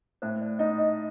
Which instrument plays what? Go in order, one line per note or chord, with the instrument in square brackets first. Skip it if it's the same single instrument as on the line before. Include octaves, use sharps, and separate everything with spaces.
[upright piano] A2 [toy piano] C5
[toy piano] D5
[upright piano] D#4 [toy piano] D#5
[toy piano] D#5